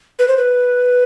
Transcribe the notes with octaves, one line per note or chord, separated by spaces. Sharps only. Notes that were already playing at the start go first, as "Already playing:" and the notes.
B4
C5
B4